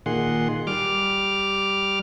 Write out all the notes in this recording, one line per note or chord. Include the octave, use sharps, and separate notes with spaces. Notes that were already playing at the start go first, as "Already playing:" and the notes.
A#2 D#3 G#4 F#5 C6
G3 D6 F6